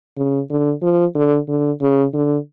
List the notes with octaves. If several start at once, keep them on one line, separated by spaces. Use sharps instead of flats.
C#3
D3
F3
D3
D3
C#3
D3